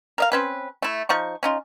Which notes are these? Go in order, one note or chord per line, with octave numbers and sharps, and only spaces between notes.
A#4 D#5 F5
C4 C#4 B4
A3 E4
F3 D#4 C#6
C#4 D#4 F4